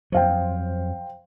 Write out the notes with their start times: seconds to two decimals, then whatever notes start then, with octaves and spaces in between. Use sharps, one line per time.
0.12 F2 F#3 C5 F5 G5